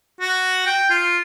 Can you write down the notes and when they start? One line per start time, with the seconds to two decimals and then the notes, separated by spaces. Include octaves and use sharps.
0.20 F#4
0.66 G5
0.90 F4